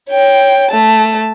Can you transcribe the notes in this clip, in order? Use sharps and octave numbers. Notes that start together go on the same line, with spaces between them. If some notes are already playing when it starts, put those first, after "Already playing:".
C#5 G5
A3 A5